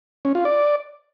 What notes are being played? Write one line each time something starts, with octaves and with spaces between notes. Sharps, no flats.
C#4
F4
D5